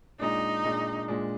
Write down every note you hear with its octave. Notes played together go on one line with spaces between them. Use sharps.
A#2 G#3 D4 D#4
A#2 G#3 D4
A#2 G#3 D4